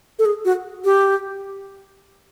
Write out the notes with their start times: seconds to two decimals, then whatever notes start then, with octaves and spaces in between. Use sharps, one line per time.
0.19 A4
0.25 G#4
0.45 F#4
0.85 G4